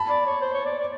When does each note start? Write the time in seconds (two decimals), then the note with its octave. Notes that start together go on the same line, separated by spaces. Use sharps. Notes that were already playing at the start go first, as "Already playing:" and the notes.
Already playing: A5 B5
0.09 D5
0.26 C#5
0.41 C5
0.54 C#5
0.66 D5
0.78 D5